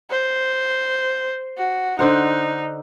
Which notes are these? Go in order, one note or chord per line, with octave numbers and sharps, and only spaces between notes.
C5
F#4
D3 D#4 C5 F#5